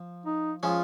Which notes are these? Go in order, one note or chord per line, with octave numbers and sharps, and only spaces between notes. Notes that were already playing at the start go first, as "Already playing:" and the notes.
Already playing: F3
D#4
F3 G#3 C#4 F4